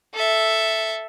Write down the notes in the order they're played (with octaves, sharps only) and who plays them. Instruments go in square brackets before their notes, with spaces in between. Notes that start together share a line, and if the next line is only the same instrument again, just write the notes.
[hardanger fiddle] A4 E5